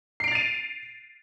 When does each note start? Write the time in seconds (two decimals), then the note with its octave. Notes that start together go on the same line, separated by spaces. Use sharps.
0.20 C7
0.24 D7
0.28 F7
0.31 A6
0.35 D#7